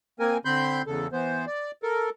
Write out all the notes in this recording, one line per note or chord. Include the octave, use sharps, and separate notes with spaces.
A#3 C4 A#4 G#5
D3 C4 B5 C6 G6
E2 C#3 A4
E3 B3 C5
D5
A4 A#4